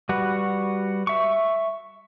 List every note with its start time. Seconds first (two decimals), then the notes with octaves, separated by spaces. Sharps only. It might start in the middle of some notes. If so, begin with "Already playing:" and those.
0.09 G3 F#4 B4
1.07 E5 C#6